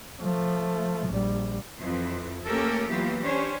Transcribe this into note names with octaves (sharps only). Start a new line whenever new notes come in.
F3 A3
A#1 G3
F2 E3
A3 A#3 C#4 G4 A4 A#4
E3 F#3 A#3 B3 F4 G4
C#4 D4 G4 C5 C#5